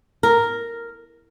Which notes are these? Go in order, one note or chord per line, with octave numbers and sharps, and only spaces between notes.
A#4